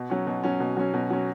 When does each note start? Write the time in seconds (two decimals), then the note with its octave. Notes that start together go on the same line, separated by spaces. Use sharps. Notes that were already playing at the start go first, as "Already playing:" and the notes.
Already playing: B2
0.10 F#3 C#4
0.27 B2
0.44 F#3 C#4
0.60 B2
0.77 F#3 C#4
0.94 B2
1.10 F#3 C#4